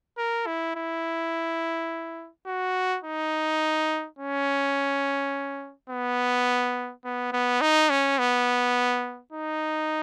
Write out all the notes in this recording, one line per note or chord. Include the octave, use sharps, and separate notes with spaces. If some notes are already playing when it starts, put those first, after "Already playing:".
A#4
E4
E4
F#4
D#4
C#4
B3
B3
B3
D#4
C#4
B3
D#4